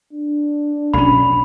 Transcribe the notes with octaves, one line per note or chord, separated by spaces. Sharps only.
D4
B1 C#4 B5